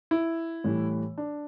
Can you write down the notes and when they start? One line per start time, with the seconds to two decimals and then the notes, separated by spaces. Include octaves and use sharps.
0.11 E4
0.64 A2 E3 G3
1.18 D4